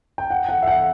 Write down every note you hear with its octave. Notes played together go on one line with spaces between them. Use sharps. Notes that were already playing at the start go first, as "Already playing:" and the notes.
G5
F#5
F#5
E5
F#5